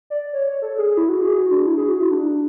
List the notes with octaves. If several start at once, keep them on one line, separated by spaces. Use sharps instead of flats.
D5
C#5
C#5
A4
G#4
E4
F#4
G#4
F#4
D4
E4
G#4
F#4
E4
D4